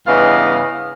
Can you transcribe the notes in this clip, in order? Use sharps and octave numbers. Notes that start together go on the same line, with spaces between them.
G2 C#3 E3 B3 D#5 F5